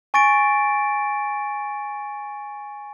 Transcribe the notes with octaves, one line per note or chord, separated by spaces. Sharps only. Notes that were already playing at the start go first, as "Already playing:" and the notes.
G#5 C#6 A6 A#6 D7